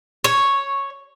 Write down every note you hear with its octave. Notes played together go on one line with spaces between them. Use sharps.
C#5